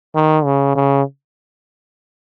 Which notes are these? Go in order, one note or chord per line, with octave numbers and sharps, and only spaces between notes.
D#3
C#3
C#3